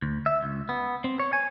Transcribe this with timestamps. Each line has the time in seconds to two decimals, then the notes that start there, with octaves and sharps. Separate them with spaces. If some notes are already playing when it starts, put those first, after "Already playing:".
0.02 D2
0.26 E5
0.42 C#2
0.69 B3
1.04 C4
1.19 C#5
1.33 G#5